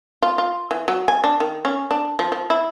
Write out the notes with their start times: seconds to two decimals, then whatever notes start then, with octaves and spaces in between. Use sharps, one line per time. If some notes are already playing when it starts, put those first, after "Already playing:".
0.22 F4
0.38 F4
0.71 E3
0.88 F#3
1.08 G#5
1.24 D4
1.40 D#3
1.65 C#4
1.91 D4
2.19 F3
2.32 F3
2.50 E4